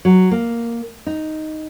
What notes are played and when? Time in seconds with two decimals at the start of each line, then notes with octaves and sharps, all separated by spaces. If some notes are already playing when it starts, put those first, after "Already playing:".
0.05 F#3
0.31 A#3
1.07 D#4